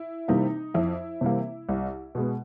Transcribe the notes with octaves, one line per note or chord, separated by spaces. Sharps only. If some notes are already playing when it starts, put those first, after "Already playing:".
Already playing: E4
C3 E3 G3 A#3 D#4
F2 E4
C3 E3 G3 A#3
C2
B2 G#3 B3